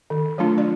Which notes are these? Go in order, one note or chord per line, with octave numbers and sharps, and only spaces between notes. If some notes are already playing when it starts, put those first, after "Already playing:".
D#3
F#3 A3 D4 F4
D5